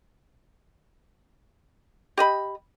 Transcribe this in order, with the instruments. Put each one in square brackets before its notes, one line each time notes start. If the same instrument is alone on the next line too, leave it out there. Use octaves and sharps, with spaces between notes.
[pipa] G4 D#5 B5